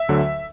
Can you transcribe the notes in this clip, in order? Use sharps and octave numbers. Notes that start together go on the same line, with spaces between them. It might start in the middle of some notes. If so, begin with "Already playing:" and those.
Already playing: E5
D2 D3 F#3